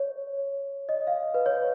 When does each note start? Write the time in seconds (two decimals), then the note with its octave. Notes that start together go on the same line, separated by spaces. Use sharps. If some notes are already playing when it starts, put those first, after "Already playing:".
Already playing: C#5
0.89 D#5
1.07 F5
1.34 B4
1.46 C#5